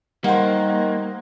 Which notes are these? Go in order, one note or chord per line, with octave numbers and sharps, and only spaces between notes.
D#3 G3 A#3 C5 F#5